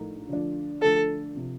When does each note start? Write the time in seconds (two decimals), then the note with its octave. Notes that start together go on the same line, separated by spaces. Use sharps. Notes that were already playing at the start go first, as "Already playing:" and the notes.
Already playing: A#1 A2 A3 D#4 A#4
0.29 D3 F3 A3 D4
0.81 D3 F3 A3 D4 A4
1.35 C3 F3